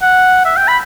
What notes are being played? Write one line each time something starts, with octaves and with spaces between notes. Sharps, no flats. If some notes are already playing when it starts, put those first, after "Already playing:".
F#5
E5
G5
B5